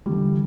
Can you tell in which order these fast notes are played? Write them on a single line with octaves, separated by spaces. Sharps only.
G3 E3 D3